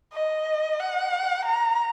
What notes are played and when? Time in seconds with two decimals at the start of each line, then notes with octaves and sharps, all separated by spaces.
0.13 D#5
0.79 F#5
1.45 A#5